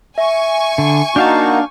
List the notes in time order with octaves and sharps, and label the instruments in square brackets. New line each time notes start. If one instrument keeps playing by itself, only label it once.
[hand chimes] E5 [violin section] G#5 C#6
[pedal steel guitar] D3
[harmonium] A#3 D#4 F#4 [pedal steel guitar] D4 F5 A5 [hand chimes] G6